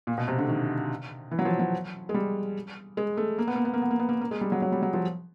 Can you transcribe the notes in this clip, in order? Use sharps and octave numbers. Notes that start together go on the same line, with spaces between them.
A#2
B2
C3
D3
D#3
E3
F#3
F3
F#3
G#3
G3
G#3
A3
A#3
B3
A#3
B3
A#3
B3
A#3
B3
A#3
A#3
G#3
G3
F#3
F#3
G3
F#3
F3